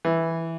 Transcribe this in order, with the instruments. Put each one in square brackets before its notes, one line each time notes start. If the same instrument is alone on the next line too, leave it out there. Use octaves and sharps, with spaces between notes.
[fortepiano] E3